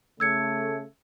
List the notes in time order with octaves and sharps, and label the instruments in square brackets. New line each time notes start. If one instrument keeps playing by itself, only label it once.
[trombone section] C#3 A3 [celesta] E6 G#6 C#7